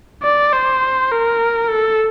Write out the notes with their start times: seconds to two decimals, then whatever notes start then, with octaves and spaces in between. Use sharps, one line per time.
0.23 D5
0.53 C5
1.11 A#4
1.70 A4